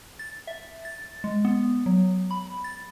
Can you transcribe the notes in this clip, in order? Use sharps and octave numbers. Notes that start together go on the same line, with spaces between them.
A6
E5
A6
G#3
B3
F#3
B5
A6